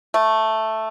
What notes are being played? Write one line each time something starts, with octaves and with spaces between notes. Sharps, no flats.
A3